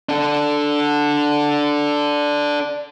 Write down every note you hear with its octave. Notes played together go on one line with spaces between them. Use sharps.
D4 A4